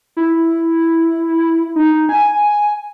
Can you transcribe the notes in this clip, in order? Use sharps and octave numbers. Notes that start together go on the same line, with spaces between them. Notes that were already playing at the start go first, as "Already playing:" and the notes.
E4
D#4
G#5